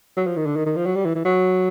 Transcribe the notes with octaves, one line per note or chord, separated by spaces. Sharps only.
F#3
F3
D#3
D3
D#3
D#3
F3
F#3
G3
E3
E3
F#3